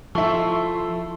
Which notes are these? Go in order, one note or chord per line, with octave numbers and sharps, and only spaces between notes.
F3 A3 E4 E5 C6 C#6